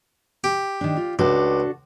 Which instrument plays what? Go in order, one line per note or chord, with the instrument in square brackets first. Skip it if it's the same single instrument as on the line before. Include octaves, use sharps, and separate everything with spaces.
[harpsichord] G4
[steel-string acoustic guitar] D#3 D4
F4
[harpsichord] C#2 [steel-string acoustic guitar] D4 F#4 A4